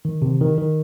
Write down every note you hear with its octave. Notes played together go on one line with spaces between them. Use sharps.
D#3
C3
D#3
D#3